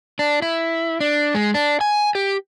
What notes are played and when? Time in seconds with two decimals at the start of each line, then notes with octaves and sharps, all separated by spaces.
0.19 D4
0.42 E4
1.00 D4
1.35 G#3
1.54 D4
1.81 G#5
2.15 G4